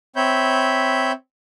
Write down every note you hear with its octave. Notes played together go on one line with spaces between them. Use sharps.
C4 C#5 E5 B5 G6